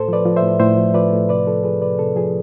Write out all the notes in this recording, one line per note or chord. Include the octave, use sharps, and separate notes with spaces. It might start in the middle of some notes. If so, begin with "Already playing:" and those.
Already playing: A2 A4 C5
F3 B4 D5
F3
C5 E5
A2
A2 C5 E5
F3
F3 B4 D5
A2
C3 B4 D5
F3 A4
F3 G#4 B4
C3 B4 D5
C3 A4
F3 G#4